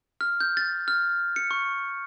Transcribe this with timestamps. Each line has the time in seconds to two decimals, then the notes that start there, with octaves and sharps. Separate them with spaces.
0.21 F6
0.40 G6
0.57 A6
0.88 F6
1.36 C#7
1.51 C#6